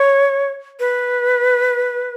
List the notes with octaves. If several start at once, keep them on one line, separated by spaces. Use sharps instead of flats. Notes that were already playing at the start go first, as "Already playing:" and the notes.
Already playing: C#5
B4